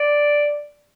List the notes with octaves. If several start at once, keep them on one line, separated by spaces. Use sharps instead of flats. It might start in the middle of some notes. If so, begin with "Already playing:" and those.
Already playing: D5